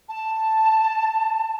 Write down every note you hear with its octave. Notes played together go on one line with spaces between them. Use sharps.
A5